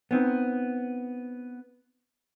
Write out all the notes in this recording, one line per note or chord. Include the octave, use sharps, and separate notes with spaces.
B3 C4 D#4